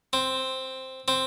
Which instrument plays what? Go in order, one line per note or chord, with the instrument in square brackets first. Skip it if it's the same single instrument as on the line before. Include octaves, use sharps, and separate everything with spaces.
[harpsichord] C4
C4